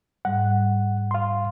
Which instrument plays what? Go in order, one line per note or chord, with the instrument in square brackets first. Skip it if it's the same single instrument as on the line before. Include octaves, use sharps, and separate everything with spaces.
[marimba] G#2 G3 [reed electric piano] F#5
[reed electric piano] F5 C6